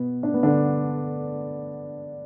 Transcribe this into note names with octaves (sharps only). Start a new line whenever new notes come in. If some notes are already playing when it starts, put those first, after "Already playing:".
Already playing: B2 B3
D4
B3
D3 D4